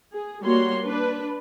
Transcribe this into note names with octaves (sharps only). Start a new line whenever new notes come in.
G#4
G3 A#3 F#4 C#5 C6
D4 B4